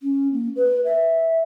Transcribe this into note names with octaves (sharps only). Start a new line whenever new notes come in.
C#4
A#3
B4
E5